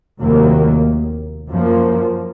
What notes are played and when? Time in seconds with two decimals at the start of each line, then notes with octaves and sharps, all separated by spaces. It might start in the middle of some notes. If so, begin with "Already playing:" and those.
0.20 F1 D#2 D#3 F#3 A#3
1.50 F#2 F3 A#3